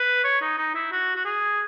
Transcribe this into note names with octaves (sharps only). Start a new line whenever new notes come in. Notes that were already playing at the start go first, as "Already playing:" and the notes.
Already playing: B4
C#5
D#4
D#4
E4
F#4
F#4
G#4